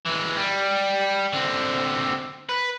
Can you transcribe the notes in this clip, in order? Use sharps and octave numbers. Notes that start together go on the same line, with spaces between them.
E3 G#3
G3
D3 C4
B4